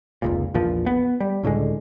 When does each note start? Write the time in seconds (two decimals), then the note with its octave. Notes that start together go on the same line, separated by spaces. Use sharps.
0.22 F1 C#2 A#2
0.54 A#1 E2 A#2 F3
0.86 B3
1.20 G3
1.43 C#2 A2 D3 G#3